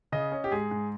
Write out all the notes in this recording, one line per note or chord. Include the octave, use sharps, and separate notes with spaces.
C#3 D#5
C#4
G4
G#2 G#4
G#2